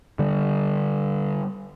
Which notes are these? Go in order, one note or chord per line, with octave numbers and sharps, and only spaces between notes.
D3 G3